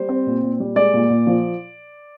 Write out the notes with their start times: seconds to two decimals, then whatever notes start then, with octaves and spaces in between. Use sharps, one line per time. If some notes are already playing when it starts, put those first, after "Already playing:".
Already playing: G3 C5
0.09 C4
0.26 A#2
0.43 A#2
0.60 G3
0.76 G#3 D5
0.94 A#2
1.10 A#2
1.27 F3